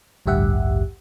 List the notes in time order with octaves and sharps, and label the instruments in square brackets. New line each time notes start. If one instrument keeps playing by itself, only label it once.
[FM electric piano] A1 D2 G2 G4 E5 F#5